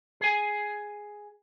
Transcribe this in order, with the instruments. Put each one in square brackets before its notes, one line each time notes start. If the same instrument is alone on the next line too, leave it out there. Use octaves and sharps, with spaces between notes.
[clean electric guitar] G#4 G#5